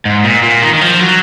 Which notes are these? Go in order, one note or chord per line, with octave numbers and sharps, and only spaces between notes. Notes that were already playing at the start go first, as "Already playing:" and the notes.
G#2
A#2
A#2
D#3
D#3
F3
F#3